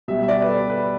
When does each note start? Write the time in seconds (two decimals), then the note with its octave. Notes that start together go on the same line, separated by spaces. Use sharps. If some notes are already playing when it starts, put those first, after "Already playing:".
0.08 B2 G3 E5
0.23 E5
0.28 D5
0.42 B4
0.49 A4
0.70 B4